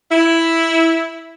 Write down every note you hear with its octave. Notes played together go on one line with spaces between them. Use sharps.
E4